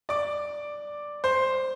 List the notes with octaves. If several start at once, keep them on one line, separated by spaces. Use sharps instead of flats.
D5 D6
C5 C6